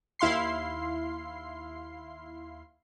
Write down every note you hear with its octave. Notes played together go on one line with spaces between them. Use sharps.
D#2 E4 F5 C6 C7